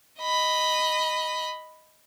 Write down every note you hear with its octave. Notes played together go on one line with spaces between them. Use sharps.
D#5 B5